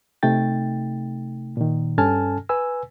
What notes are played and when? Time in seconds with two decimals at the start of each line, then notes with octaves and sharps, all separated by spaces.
0.23 C3 A3 D#4 G5 A6
1.57 A#2 D#3
1.98 G2 C#4 A4 G#5 A5 F6
2.49 B4 G#5 E6